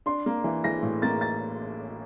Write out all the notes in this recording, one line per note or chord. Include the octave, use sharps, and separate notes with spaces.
D4 C6
A#3
E3
E3 A#6
A2
A#3 A6
A6